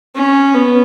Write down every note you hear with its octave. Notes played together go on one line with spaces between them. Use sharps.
C#4
B3